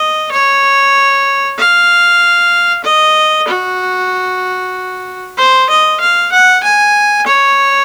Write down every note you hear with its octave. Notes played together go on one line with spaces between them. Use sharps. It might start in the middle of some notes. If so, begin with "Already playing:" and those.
Already playing: D#5
C#5
F5
D#5
F#4
C5
D#5
F5
F#5
G#5
C#5